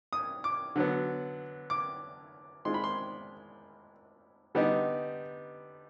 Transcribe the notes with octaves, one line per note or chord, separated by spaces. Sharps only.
D#6
D6
D3 F#3 B3
D6
D#3 G#3 C4 F4 C6
B5
C6
D3 G3 B3 D#4